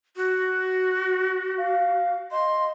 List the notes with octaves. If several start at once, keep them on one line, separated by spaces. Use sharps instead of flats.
F#4
F5
D#5 C6